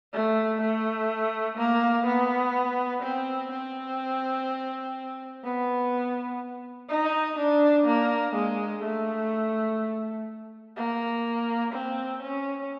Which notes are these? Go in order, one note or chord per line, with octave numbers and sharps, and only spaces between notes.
A3
A3
A#3
B3
C4
C4
B3
D#4
D4
A#3
G#3
A3
A#3
C4
C#4